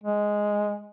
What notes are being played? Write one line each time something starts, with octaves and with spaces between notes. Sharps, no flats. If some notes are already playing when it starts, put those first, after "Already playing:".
G#3